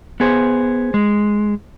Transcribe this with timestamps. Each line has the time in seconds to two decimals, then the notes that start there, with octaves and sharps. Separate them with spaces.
0.20 B3 G#4 C5
0.94 G#3